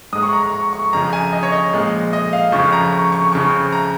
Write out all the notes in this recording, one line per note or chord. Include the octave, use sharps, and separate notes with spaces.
G#2 G#3 D#6
C#6
A#5
A#5
C#6
C#6
F2 C#3 F3 A#5
G#5
D#5
C#5
D#5
A#2 F3 G#3
D#5
F5
F2 C#3 F3 C#6
A#5
C#6
C#6
F2 C#3 F3 C#6
A#5